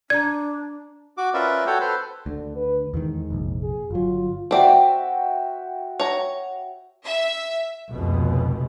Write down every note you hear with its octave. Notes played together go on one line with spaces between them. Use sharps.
D4 D5 A#5 G#6
F#4 D6
C#4 F4 A#4 B4 D5 E5
F#4 A4 C#5 F#5 G5
A4 B4 C5
D2 D3
B4
E2 G#2 D3 D#3
F1 A#1
G#4
G1 F#3 F4
C4 F#4 D5 E5 G5
C#5 A#5
E5
F1 C#2 B2